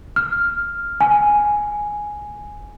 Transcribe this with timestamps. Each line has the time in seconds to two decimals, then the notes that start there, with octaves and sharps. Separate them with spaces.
0.16 F6
1.01 G#5